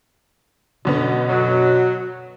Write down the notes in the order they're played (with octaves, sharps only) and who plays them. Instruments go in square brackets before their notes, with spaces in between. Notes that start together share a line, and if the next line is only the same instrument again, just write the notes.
[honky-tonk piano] F#2 D3 B3 [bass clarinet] B2
[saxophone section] F#3